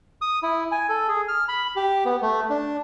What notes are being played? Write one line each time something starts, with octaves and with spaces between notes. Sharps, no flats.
D#6
E4
G#5
A4
G#4
F6
B5
G4
B3
A3
D4